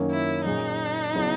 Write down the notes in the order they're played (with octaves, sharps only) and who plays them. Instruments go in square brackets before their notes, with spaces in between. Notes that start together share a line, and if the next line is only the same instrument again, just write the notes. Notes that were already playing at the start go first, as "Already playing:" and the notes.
Already playing: [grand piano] F#2 D#3 F#3 A#3 C#4
[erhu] E4
[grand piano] A#2 F#3 C#4 G#4 [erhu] D#4
[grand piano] C#3 F#3 B3 E4 G#4